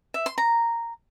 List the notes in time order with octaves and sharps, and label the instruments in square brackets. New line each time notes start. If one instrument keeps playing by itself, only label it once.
[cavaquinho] E5
C6
A#5